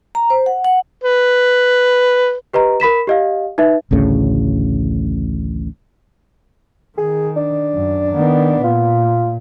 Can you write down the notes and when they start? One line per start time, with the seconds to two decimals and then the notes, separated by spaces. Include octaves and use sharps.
0.15 A#5
0.30 C5
0.46 F#5
0.65 F#5
1.04 B4
2.53 G4 B4 D#5 A#5
2.80 A#4 B5 B6 E7
3.07 G4 D#5 F5
3.58 D#4 B4 E5
3.91 A1 D2 A2 C#3
6.98 D#3 G#4
7.36 D4
7.74 F#2
8.12 D#3 B3
8.64 A#2 F4